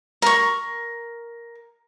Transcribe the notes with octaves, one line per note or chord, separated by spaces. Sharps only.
A#4 C#6